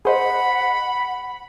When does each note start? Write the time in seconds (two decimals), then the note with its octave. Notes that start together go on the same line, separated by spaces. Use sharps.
0.05 G#4 C5 D#5 F#5 B5